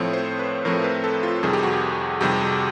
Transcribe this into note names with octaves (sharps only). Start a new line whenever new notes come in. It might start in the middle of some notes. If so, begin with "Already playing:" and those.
Already playing: A2 F3 A3 C4 C#5
C5
B4
A2 F3 A3 C4 A#4
B4
A4
F4
F2 C3 D#3 G3 G#4
G4
F#4
G4
F2 C3 D#3 G3 G4
G#4